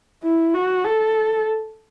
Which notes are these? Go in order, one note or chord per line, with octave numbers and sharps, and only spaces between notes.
E4
F#4
A4